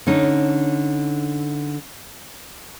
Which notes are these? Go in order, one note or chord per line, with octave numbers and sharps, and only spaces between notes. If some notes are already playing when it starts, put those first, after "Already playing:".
D3 C#4 D#4